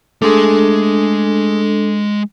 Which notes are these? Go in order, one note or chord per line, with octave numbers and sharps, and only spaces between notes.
G#3 A3 D4 G#4 A4 C6